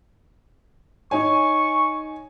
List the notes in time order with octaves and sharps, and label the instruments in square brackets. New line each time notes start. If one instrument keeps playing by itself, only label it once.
[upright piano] D#4 C#5 G#5 [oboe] C#6